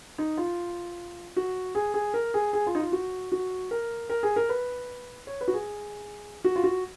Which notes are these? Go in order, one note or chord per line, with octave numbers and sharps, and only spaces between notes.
D#4
F4
F#4
G#4
G#4
A#4
G#4
G#4
F4
D#4
F4
F#4
F#4
A#4
A#4
G#4
A#4
B4
C#5
B4
F#4
G#4
F#4
F4
F#4